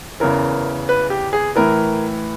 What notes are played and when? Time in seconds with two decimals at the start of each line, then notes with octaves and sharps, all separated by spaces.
0.20 E2 C#3 E3 A#4
0.89 B4
1.10 G4
1.33 G#4
1.56 A2 E3 A#4